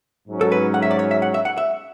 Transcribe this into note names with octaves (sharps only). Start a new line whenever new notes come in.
G#2 F#3 C#4
A4
B4
F#5
E5
D5
C#5
E5
F#5
E5
F#5
E5